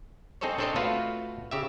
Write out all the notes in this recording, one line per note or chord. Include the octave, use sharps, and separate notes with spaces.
C4 D#4 G#4 A4 C5 C#5
C4 D4 A4 C5 C#5 D#5
A3 F4 F#4 B4 F5
C#3 G4 E5